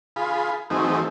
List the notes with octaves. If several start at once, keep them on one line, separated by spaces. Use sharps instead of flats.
F4 G#4 B5
E3 F#3 A3 C4 D#4 G#4